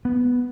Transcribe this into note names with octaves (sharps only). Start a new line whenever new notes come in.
B3